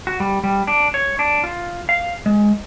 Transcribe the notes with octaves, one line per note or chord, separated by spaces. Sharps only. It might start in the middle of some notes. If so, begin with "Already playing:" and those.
F#4
G3
G3
D4
C#5
D4
F4
F5
G#3